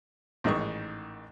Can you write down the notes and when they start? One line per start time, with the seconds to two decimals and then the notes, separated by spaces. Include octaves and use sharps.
0.44 A1 G#2 D#3 C#6